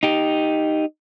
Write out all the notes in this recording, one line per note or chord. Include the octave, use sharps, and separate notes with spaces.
D#4 G4